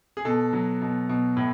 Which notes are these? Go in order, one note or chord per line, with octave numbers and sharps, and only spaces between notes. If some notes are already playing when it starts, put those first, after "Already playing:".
G#4
B2 A4
F#3
B2
B2
A2